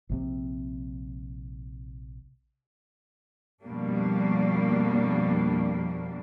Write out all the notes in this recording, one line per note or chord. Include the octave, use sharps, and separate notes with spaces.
A#1 C3 C4
F2 B2 G3 A#3 D4